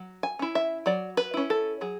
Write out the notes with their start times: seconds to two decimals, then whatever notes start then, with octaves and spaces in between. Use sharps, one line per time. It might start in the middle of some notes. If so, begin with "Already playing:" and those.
Already playing: F#3
0.23 G#5
0.39 C#4 E4
0.55 E5
0.86 F#3 D5
1.17 B4
1.34 C#4 E4
1.50 A4
1.81 F#3 G#4